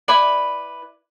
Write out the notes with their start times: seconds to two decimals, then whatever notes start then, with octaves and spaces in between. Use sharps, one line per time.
0.08 E4 B4 D5 B5